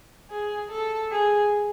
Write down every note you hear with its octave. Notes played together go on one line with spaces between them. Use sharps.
G#4
A4
G#4